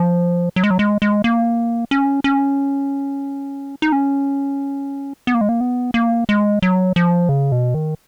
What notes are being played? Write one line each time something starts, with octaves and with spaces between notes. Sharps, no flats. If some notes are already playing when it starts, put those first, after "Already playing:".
Already playing: F3
F#3
G#3
F#3
G#3
G#3
A#3
C#4
C#4
D#4
C#4
B3
A#3
G#3
A#3
B3
A#3
G#3
F#3
F3
C#3
B2
D#3